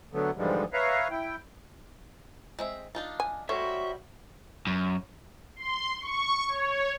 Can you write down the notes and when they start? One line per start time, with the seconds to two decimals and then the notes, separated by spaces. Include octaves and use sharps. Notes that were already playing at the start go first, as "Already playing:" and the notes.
0.13 D3 F#3 A3 B3
0.37 G#2 D3 E3 F3 G3 G#3
0.73 B4 C#5 E5 F5 A#5
1.11 E4 G5
2.59 G#3 C4 E5
2.95 D4 D#4 F4
3.20 G#5
3.49 G3 F#4 A4 C5 C#5 E5
4.67 F#2
5.56 C6
6.01 C#6
6.48 C#5